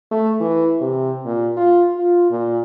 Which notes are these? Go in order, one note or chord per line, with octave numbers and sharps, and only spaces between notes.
A3
E3
C3
A#2
F4
F4
A#2